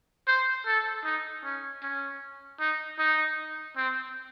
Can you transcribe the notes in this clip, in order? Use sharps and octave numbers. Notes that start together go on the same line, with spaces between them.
C5
A4
D#4
C#4
C#4
D#4
D#4
C4